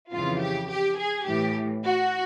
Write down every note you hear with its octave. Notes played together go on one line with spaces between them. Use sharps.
F2 C#3 E3 F4
G4
G4
G#4
A2 E3 G4
F#4